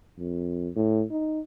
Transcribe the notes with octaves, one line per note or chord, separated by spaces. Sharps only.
F2
A2
D#4